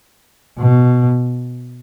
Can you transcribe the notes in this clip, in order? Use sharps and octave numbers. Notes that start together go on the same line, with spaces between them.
B2